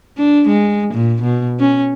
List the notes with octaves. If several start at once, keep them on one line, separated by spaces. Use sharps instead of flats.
D4
G#3
A#2
B2
C#4